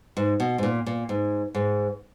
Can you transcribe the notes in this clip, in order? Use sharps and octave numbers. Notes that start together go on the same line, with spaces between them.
G#2
B2
G#2
A#2
A#2
G#2
G#2